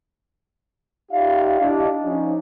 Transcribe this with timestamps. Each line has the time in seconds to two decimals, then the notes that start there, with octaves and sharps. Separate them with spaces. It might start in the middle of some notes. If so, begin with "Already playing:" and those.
1.11 D#4 F4 G4 D5 E5 F5
1.61 D4 E4 G4 D#5
2.05 F3 C#4 D#4